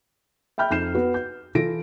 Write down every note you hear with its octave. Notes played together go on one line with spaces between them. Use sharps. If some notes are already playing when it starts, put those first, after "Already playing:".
E5 G5 B5 F6 G6
F2 D#4 G6 C7 E7
B3 F#4 B4
G6
E3 E4 F4 A4 A#6 D7